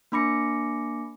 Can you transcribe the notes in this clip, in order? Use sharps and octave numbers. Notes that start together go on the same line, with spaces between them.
A#3 D4 B5 D6 A#6 C#7